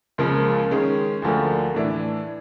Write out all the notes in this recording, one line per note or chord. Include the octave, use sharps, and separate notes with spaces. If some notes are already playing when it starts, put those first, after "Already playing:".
C#2 C#3 F3 A#3
D#3 G#3 C#4
D2 D3 F3 A#3
A2 E3 A3 D4